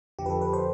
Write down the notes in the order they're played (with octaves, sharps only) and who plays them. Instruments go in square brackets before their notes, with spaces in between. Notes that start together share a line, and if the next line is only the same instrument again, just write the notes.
[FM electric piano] F2 D3 F3 G4
B4
A4
B4
C5